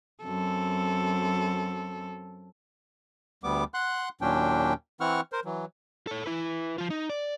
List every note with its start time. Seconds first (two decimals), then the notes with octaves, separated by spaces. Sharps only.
0.24 F#2 C4 A4
3.43 D2 G3 B3 D6
3.74 F#5 C6 F#6
4.21 D#2 A#2 F#3 C#4 D4 G5
5.01 E3 C4 E4 F#5 C#6 F6
5.32 A#4 C5
5.45 E3 F#3
6.07 A4 C#5
6.26 E4 B4
6.78 F3 F4
6.90 D#4
7.10 D5